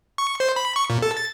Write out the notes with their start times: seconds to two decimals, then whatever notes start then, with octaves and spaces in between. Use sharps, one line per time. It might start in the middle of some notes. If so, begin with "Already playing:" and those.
0.18 C#6
0.40 C5
0.56 B5
0.76 C#6
0.90 A#2
1.02 A4
1.17 A6